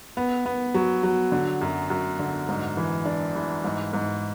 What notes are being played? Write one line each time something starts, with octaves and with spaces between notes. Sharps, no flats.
B3
B3
F#3
F#3
D3
F#2
F#2
D3
G#2
E3
D4
E3
G#2
G#2